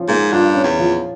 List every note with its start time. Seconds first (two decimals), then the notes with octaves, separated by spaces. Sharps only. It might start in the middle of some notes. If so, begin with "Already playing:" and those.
Already playing: F3 C#4
0.08 G#2 A#3
0.32 G2 F4
0.55 C#4
0.64 E2
0.79 F3